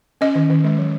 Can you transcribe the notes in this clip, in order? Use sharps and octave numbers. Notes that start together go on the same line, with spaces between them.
C#4 D#5
D#3
D#3
G#3
F#3